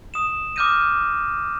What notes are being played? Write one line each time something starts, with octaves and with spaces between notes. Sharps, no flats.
D#6 E7
D6 D#6 F6 G6 A#6 D#7